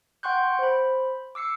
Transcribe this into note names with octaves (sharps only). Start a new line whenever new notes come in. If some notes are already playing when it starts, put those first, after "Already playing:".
F#5 G5 C6 C#6 F#6 G6
C5 B5
D6 E6 C7 C#7